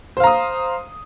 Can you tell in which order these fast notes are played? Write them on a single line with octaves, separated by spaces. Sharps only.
C5 F5 A#5 D#6